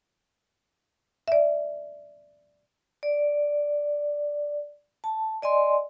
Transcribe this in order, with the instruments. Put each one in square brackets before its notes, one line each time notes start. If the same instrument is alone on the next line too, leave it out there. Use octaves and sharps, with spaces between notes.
[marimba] D5 E5
[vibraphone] D5
A5
D5 D#5 G#5 C6